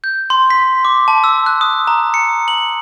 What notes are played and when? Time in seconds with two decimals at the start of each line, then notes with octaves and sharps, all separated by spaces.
0.04 G6
0.30 C6
0.50 B6
0.85 D6
1.08 A5
1.24 E6
1.46 F#6
1.61 D#6
1.87 A#5
2.14 C#7
2.48 F#7